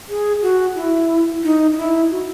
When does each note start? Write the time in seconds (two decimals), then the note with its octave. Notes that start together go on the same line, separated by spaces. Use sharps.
0.09 G#4
0.42 F#4
0.76 E4
1.44 D#4
1.73 D#4
1.77 E4
2.11 F#4